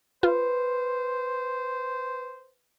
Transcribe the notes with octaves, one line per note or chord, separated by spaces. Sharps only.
F4 B4 C5